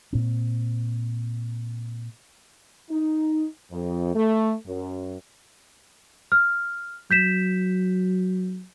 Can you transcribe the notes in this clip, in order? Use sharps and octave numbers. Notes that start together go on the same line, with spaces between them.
A#2 C4
D#4
F2
A3
F#2
F6
F#3 G6 B6 E7